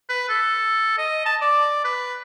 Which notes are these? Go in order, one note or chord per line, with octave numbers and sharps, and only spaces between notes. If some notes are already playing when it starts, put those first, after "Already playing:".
B4
A4
D#5
A5
D5
B4